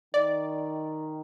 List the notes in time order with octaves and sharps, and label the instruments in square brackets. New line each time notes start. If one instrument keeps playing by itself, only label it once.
[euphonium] D#3 [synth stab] D5